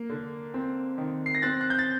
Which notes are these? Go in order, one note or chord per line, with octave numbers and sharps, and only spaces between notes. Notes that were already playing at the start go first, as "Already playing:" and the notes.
Already playing: A#3
D3
C4
D#3
C7
A#6
C4 F#6 A6
F#6
G6
A6